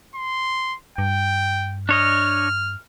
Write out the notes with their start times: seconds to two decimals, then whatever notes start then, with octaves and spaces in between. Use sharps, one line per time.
0.16 C6
0.98 G2 G5
1.89 D4 C#5 D#5 F6